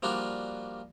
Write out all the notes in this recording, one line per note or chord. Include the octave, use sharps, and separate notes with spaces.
F3 G3 A#3 D4 F4 F#4